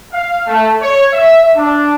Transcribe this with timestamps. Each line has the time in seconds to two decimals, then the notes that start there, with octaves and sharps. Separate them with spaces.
0.13 F5
0.47 A3
0.81 C#5
1.13 E5
1.55 D4